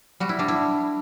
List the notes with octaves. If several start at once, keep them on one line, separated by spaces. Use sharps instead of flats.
G3 F#4
E4
G3 D4
E4